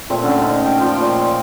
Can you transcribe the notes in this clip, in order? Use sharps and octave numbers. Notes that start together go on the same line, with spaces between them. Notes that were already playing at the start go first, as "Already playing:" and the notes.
A#2 A3 C4 E5
D3 C#4
D#4
G5
F3 F4 G5
A#2 C6 C#6